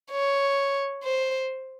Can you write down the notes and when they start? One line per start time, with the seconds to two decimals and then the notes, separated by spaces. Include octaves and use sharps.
0.11 C#5
1.03 C5